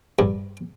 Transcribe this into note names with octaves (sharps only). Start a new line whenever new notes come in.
G2